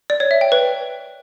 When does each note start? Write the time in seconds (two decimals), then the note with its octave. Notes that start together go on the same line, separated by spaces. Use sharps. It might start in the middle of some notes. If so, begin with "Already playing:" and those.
0.10 D5
0.20 C#5
0.31 E5
0.41 G5
0.52 B4